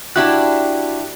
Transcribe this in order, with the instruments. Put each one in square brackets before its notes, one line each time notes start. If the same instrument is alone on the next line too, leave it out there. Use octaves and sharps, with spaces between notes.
[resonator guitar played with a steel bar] D4 E4 G4 [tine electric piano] F#4 F#6